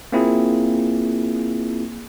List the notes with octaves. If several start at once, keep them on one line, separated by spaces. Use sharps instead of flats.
A#3 C4 E4 F4 G#4